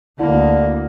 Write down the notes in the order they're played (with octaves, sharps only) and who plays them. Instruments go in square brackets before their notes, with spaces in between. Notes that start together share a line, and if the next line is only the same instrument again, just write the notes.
[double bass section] D2 [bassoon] D3 [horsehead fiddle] A#3 [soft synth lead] E4